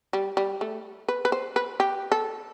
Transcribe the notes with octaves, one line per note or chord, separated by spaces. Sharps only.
G3
G3
A3
B4
B4
C5
B4
G4
A4